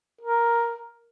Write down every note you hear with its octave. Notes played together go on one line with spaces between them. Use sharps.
A#4